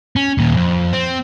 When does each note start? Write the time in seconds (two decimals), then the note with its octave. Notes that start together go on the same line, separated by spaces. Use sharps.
0.16 C#4
0.38 D#2 A#2
0.56 F2
0.93 C4